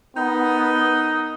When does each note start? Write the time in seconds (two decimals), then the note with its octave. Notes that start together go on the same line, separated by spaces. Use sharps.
0.16 B3 D#4 A#4 D#5